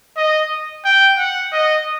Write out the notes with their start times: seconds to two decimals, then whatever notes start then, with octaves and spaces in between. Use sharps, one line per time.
0.17 D#5
0.85 G5
1.18 F#5
1.52 D#5